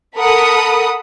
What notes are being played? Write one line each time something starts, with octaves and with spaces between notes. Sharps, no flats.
A4 A#4 F#5 B5 D#6